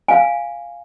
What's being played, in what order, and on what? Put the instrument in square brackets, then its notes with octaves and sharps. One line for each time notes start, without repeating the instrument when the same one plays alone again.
[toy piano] F5 G#5